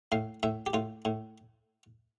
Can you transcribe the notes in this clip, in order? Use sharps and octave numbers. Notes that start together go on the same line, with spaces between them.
A2 F5
A2 E5
G4
A2 F4
A2